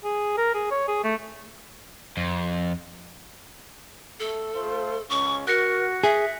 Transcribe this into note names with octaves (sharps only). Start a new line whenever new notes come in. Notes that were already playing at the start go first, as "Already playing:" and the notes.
G#4
A#4
G#4
C#5
G#4
A3
F2
A3 A4
A3 F4 C5
C#2 C#4 C#6
F#4 A#4 F#6 A#6 C#7
G#4 E5